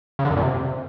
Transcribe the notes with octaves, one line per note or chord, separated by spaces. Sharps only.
C#3
D3
F#2
A#2
C3